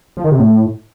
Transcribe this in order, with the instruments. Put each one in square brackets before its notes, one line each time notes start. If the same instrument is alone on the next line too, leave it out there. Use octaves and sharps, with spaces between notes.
[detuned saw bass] F3
D#3
C3
A2